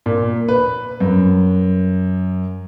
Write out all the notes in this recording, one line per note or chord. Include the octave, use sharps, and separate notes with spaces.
A#2
B4
F#2